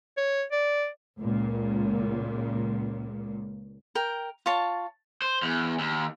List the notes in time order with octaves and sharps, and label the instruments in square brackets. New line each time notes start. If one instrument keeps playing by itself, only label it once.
[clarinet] C#5
D5
[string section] C#2 A#2
[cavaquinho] A#4 G5
F4 C#5 A5
[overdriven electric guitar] C5
E2
D#2